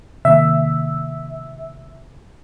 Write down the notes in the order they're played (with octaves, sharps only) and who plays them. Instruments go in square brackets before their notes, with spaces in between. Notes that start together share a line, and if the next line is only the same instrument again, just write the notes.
[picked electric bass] C3 D#3 A#3 [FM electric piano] E5